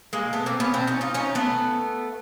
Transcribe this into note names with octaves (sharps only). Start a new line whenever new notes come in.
G#3 A#3
A3 B3
A#3 C4
B3 C#4
C4 D4
C#4 D#4
D#4 F4
C#4 D#4
A3 B3